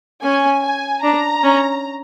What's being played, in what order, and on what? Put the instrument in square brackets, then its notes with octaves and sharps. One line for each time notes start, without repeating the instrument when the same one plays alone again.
[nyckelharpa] C#4 [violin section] G#5
[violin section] G#5
[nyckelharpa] D4 [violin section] A#5
[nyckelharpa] C#4